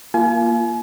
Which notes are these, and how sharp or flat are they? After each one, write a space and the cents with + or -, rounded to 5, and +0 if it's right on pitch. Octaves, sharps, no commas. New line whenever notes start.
A#3 +10 F4 -20 G#5 +35